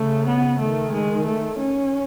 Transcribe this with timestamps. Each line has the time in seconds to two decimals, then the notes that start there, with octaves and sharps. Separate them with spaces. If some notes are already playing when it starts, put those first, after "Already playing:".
Already playing: C#3 A3
0.27 B3
0.59 D#3 A3
0.93 G#3
1.26 A3
1.59 C#4